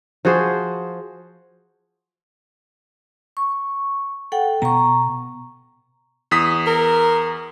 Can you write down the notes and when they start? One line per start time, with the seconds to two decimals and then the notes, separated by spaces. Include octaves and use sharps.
0.25 F3 F#4 G#4 C5
3.37 C#6
4.32 A4 F#5 G5
4.62 B2 B3 A#5 C#6
6.31 E2 D#6 B6
6.67 A#4